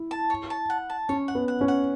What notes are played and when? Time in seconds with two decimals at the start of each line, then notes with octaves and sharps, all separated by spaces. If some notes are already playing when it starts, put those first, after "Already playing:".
Already playing: E4
0.11 A5
0.30 C#5
0.50 A5
0.70 F#5
0.90 A5
1.09 C#4 C#5
1.28 F#5
1.35 B3
1.48 F#5
1.61 C#4
1.68 F#5